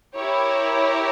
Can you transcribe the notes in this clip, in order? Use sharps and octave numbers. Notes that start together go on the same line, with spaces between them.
E4 G4 A#4 C#5